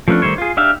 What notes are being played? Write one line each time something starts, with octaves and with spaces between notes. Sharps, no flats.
F3 A3 B3 C#4 D4
D#3 G3 A3 C5 C#5
F4 G#4
D4 D#4 G4 E5 F5